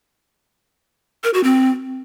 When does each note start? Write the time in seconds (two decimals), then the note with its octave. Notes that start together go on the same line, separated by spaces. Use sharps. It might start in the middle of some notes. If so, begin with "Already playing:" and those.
1.24 A#4
1.34 F#4
1.44 C4